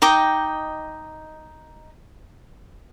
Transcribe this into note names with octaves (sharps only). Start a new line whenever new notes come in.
D#4 D#5 G5 D6